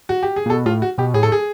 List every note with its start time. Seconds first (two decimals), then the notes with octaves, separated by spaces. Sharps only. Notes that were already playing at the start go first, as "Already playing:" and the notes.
0.09 F#4
0.23 G4
0.36 G#4
0.46 A#2
0.50 B2 A4
0.65 A2 F4
0.82 F#4
0.98 B2 G4
1.14 A2 G#4
1.23 A4
1.32 G#4